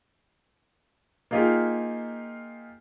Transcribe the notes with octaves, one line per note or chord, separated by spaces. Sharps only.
A#3 D#4 F4 G4 G#4